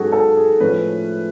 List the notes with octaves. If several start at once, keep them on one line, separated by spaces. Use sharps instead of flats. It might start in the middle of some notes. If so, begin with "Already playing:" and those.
Already playing: G#2 F#3 C#4 F#4 G#4 A4
A4
G#4
A2 F3 A3 C#4 B4